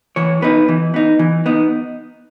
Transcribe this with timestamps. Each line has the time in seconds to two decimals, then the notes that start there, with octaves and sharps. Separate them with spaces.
0.16 E3 C#5
0.42 B3 D#4 B4
0.68 E3
0.94 B3 D#4
1.19 E3
1.46 B3 D#4